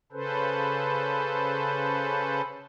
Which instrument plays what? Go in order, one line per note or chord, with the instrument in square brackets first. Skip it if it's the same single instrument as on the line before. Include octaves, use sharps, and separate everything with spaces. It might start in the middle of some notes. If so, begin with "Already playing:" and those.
[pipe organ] C#3 C#4 A4 B4 C5